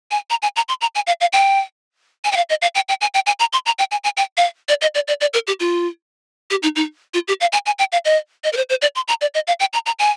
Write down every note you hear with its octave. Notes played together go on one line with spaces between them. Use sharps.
G#5
A#5
G#5
A#5
C6
A#5
G#5
F5
F5
G5
G#5
G5
F5
D#5
F5
G5
G5
G#5
G5
G#5
A#5
C6
A#5
G5
G#5
G#5
G5
F5
D5
D#5
D5
D5
D5
A#4
G4
F4
G4
D#4
D#4
F4
G4
F5
G#5
G#5
G5
F5
D#5
D#5
A#4
C5
C5
D5
C6
A#5
D5
D#5
F5
G5
A#5
A#5
G#5